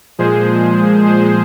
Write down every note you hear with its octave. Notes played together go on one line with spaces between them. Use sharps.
A#2 F3 G#3 G#4 C5
G#4 C5